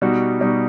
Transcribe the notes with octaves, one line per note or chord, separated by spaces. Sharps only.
B2 G3 D#4 F#4
B2 G3 D#4 F#4